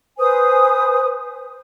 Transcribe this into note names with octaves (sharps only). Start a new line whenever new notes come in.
B4 C5 G#5 D#6